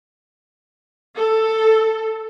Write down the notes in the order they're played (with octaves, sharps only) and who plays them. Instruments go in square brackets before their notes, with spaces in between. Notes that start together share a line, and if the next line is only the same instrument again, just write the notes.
[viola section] A4